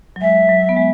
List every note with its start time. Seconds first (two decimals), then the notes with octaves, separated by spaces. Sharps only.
0.16 F#3
0.21 G#3 E5
0.49 F#3
0.69 B3
0.77 G#3